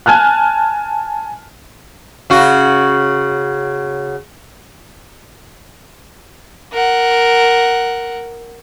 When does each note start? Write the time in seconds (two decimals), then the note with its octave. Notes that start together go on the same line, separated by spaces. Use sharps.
0.06 G#5 A5 F6 F#6
2.30 C#3 F#4
6.73 A#4 F#5